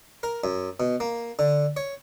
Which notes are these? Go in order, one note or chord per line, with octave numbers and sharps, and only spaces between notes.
A#4
F#2
B2
A#3
D3
C#5